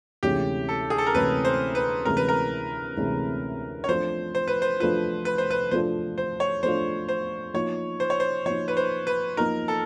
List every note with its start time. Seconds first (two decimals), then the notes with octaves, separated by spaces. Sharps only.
0.23 D2 C3 E3 G#3 C#4 G4
0.69 A4
0.90 G#4
0.98 A4
1.06 A#4
1.14 D2 C3 E3 G#3 C#4 B4
1.45 C5
1.75 B4
2.05 D2 C3 E3 G#3 C#4 A#4
2.17 B4
2.28 A#4
2.97 D2 C3 E3 G#3 C#4
3.84 C#5
3.89 F3 A3 D4 F4 C5
4.35 C5
4.48 B4
4.62 C5
4.80 F3 A3 D4 F4 B4
5.25 B4
5.38 C5
5.50 B4
5.71 F3 A3 D4 F4 C5
6.18 C5
6.40 C#5
6.63 F3 A3 D4 F4 C5
7.09 C5
7.54 F3 A#3 D#4 C#5
8.00 C5
8.10 C#5
8.20 C5
8.46 F3 A#3 D#4 C#5
8.68 B4
8.77 C5
9.07 B4
9.37 F3 A#3 D#4 A#4
9.68 A4